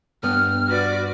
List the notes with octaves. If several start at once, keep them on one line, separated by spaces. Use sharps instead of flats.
G2 B3 F6
F#4 B4 D5